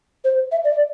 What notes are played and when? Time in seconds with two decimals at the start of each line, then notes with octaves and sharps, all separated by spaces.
0.24 C5
0.52 E5
0.64 D5